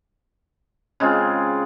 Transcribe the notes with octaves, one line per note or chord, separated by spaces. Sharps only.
C#3 G#3 C4 F4